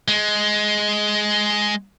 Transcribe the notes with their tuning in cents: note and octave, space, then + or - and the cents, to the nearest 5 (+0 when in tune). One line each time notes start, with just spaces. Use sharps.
G#3 +10